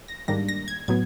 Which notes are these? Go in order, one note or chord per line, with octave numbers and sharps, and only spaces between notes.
A#6
G#2 D#3 G3 A#3 D4 A#6
A#6
G#6
A2 F#3 B3 G#6